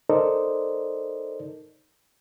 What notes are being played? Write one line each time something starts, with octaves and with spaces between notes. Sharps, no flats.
D#4 A4 A#4 C5 D5 D#5